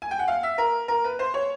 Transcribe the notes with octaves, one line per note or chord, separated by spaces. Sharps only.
G#5
G5
F#5
F5
E5
A#4
A#4
B4
C5
C#5